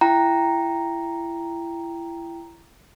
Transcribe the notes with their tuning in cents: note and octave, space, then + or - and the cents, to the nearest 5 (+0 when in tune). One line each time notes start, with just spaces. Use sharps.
E4 +30 G5 +0 A#5 +0